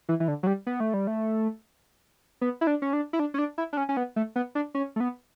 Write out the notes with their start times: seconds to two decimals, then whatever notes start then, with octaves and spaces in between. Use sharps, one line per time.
0.09 E3
0.20 E3
0.28 D3
0.43 F#3
0.47 G3
0.67 B3
0.80 A3
0.94 G3
1.07 A3
2.41 B3
2.61 E4
2.67 D4
2.82 C#4
2.93 D4
3.13 E4
3.19 D4
3.34 C#4
3.38 D4
3.58 E4
3.73 D4
3.77 C#4
3.89 C#4
3.97 B3
4.16 A3
4.36 B3
4.55 D4
4.75 C#4
4.96 A3
5.00 B3